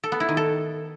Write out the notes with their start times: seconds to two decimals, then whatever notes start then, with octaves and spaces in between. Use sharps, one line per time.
0.04 A4
0.12 B3
0.20 E4
0.29 D#3
0.37 A4